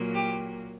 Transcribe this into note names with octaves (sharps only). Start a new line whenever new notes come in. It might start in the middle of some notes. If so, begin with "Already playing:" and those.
Already playing: A#2 F#3 A#3
G4